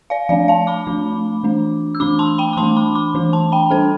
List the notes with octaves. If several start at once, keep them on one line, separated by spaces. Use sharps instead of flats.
D5 F5
F3 A3 D4 D5 F5
F5 A5
B5 D6
F3 A3 D4
E3 A3 D4
E6
E3 A3 D4 B5 D6
A5 C6
G5 B5
D6
E3 A3 D4 A5 C6
B5 D6
B5 D6
E3 A3 D4
A5 C6
G5 B5
G3 D4 A4 C5